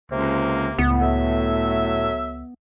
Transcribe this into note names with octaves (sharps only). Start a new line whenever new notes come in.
C#2 C3 A#3
C#2 A2 B3
F#3 A3 E5